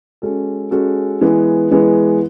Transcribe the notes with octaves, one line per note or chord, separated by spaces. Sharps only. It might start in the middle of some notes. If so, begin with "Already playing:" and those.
G#3 C#4 F#4 A4
G#3 C#4 F#4 A4
E3 G#3 B3
E3 G#3 B3